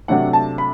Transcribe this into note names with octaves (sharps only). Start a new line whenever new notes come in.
C3 F#3 A3 D4 F#5
A5
B5